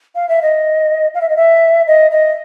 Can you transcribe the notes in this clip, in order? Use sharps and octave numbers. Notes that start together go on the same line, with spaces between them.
F5
E5
D#5
F5
E5
D#5
E5
D#5
D#5